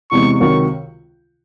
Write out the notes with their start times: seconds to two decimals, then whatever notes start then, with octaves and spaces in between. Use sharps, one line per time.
0.11 E2 C3 E3 G#3 C#6
0.40 C#2 C3 D#3 F#3 C#6